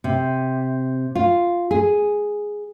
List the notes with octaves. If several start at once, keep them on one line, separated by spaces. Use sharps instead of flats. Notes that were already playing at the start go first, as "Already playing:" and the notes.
C3
F4
G#4